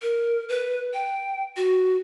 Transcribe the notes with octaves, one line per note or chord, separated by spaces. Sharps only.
A#4
B4
G5
F#4